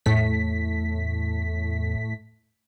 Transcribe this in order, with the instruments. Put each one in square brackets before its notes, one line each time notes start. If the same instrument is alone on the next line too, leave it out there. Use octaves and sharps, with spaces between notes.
[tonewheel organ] E2 [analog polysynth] A2 A3 B6